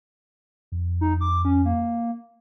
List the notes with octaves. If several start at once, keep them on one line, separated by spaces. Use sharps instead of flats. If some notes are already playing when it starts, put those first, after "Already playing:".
F2
D#4
D6
C#4
A#3